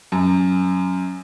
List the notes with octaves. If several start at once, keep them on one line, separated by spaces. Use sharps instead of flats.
F#2